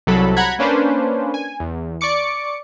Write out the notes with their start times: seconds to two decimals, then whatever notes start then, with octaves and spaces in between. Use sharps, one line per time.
0.07 C2 F#3 A4 B5
0.37 F#5 A#5 B5 F#6 G#6
0.59 A#3 C#4 D4 B4 C5
1.34 G#5
1.60 E2
2.01 D5 C#6 D6 C#7